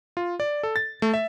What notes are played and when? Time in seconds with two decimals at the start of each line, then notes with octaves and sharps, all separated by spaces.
0.17 F4
0.40 D5
0.63 A4
0.76 A6
1.02 A3
1.14 E5